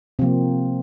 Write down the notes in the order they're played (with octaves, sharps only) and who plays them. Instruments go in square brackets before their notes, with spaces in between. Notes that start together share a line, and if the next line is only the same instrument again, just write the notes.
[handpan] C3 F3 A#3 C4